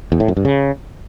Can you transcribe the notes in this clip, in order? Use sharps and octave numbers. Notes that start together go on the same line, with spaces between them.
E2
A2
F#2
G2
C#3